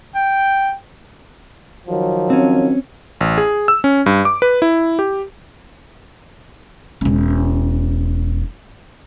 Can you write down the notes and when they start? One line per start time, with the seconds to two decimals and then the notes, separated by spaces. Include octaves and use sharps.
0.15 G5
1.88 D#3 F3 F#3
2.30 C4 C#4
3.21 A1
3.38 G#4
3.68 E6
3.84 C#4
4.06 G2
4.25 D6
4.42 B4
4.62 E4
4.99 G4
7.01 E1 C#4